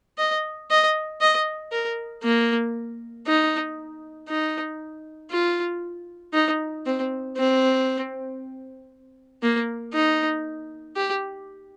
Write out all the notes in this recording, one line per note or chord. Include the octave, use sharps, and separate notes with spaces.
D#5
D#5
D#5
A#4
A#3
D#4
D#4
F4
D#4
C4
C4
A#3
D#4
G4